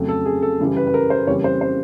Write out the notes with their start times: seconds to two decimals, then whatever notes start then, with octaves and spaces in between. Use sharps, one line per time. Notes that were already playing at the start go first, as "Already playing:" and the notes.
Already playing: F2 C#3 F#3 A3
0.08 A4
0.26 G#4
0.43 A4
0.60 F#2 C#3 E3 G3
0.77 B4
0.87 B4
0.94 A#4
1.10 C5
1.27 F2 C#3 E3 G3 A#3 C#5
1.44 C5
1.61 C5